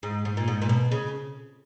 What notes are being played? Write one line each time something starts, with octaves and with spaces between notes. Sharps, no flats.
G#2
G#2
A#2
G#2
A#2
B2
C#3